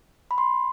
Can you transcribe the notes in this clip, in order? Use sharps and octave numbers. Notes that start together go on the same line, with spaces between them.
B5
C6